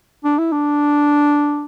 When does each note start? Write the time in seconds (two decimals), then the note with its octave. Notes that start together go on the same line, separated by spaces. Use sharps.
0.25 D4
0.38 E4
0.52 D4